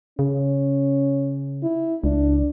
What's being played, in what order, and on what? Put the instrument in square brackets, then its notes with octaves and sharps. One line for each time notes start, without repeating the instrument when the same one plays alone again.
[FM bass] C#3 [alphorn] C#4
[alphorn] E4
[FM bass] C#2 [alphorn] D4